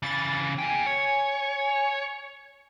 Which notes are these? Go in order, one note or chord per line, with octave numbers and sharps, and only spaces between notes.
C#3 E3 A6
A#3 G5 G#5
C#5